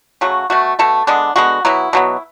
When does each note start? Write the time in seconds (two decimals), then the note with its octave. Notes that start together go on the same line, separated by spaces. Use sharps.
0.21 C#3 F#3 A3 F#4
0.50 B2 A3 F#4
0.79 B2 A3 A4
1.07 D3 G#3 B3 D4
1.36 D3 G#3 B3 F#4
1.65 B2 F#3 B3 E4
1.93 B2 F#3 B3